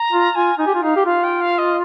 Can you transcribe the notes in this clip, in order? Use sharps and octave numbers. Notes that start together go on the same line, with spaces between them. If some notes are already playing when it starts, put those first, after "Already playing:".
Already playing: A#5
F4
F4 G#5
D#4 G#5
G4
F4
D#4 F5
G4
F4 F5
G5
F5
D#5